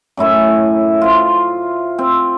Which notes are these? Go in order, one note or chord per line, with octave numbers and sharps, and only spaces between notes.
F#2 A2 E4 G#5
F4 C5
C4